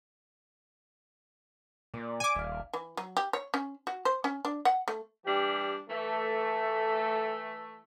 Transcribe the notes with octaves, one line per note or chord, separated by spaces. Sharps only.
A#2 D5
G#5 D6
D#1 E5 F5
E3
F#3
G4
C#5
C#4
F#4
C5
C#4
D4
F#5
A3
E3 G3 D4 G4
E3 A3